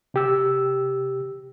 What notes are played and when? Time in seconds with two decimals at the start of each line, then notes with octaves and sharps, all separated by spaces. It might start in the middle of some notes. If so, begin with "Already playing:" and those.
0.14 C3 G4 E6